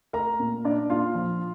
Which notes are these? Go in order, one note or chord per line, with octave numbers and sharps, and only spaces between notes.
A3 A#4 A#5
A#2
D4 D5
A#2 F4 F5
F3